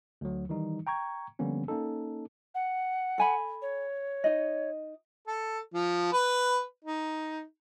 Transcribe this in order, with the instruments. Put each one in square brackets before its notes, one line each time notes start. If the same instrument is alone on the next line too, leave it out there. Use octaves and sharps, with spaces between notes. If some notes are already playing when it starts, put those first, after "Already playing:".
[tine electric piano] D2 F#3
D#3 E3 G3 D#4
G5 A#5 C#6 G#6
D3 F3 G3 A#3 B3 C#4
A#3 C#4 D#4 A4
[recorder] F#5
[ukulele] A4 G#5 B5
[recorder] C#5
[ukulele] D#4 D#5
[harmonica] A4
F3
B4
D#4